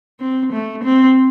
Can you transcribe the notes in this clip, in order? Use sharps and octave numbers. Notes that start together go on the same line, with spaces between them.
C4
A3
C4